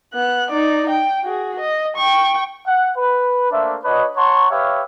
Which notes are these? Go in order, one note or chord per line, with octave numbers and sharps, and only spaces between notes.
B3 F#6
D#4 D5
G5
F#4 G#4
D#5
G5 C#6
F#5
B4
A3 A#3 D4 C5 E5
D4 F#4 B4 C#5 D#5
C#5 F#5 A5 A#5 C6 C#6
G4 B4 C#5 E5 F5